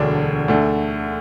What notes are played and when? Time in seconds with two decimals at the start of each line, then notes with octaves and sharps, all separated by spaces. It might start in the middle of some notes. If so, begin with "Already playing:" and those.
Already playing: E1 D2 D3 F#3 D4
0.48 D2 D3 A3